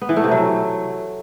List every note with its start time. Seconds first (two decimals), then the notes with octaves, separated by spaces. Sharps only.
0.02 B3
0.09 E3
0.16 A3
0.24 C3
0.31 F#3